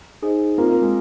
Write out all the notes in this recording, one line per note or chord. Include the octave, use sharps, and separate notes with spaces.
D#4 G#4 C5 D#5
A#3 C4 F4 A#4
A#3
G#3